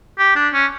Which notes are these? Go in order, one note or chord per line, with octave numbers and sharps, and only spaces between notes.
G4
D4
C#4